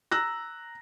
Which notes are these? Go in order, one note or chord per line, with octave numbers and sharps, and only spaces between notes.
A#5 E6 F#6 A#6